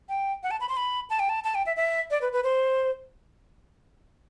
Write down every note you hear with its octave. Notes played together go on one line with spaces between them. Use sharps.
G5
F#5
A5
B5
C6
B5
A5
G5
A5
A5
G5
E5
E5
D5
B4
B4
C5